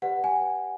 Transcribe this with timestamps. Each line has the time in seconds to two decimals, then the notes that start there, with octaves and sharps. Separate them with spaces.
0.02 G4 B4 D5 F#5
0.24 G#5